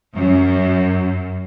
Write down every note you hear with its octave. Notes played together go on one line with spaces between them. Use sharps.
F#2